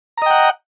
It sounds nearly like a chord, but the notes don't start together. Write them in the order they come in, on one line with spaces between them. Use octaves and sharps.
A#5 D#5 G5 F#5